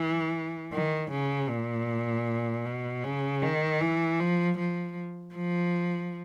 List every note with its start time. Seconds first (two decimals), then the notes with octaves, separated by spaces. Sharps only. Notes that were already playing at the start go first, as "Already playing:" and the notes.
Already playing: E3
0.73 D#3
1.11 C#3
1.49 A#2
2.65 B2
3.04 C#3
3.42 D#3
3.81 E3
4.20 F3
4.58 F3
5.35 F3